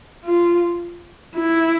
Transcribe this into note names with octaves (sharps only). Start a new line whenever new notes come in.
F4
E4